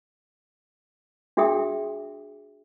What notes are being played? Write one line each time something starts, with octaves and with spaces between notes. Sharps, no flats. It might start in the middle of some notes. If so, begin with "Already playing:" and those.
D4 F#4 G#4 E5 G5 D#6